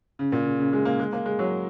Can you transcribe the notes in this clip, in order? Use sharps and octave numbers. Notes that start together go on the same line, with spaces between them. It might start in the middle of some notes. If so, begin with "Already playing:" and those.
C#3
A#2
C#3
C#3
G#3
A#3
G#3
A#3
G#3
F#3